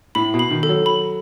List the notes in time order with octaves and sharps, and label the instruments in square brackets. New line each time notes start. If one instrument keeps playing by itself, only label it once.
[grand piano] A2 [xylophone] B5
[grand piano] B2
[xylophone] B5
[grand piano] D#3
[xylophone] A4
[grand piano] F#3
[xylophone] B5